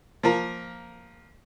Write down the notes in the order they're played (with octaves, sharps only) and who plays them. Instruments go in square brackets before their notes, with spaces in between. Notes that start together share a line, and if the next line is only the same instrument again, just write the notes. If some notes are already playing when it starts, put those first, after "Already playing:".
[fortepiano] F3 A#3 A#4